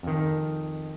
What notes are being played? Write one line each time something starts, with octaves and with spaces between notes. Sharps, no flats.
F2 D#3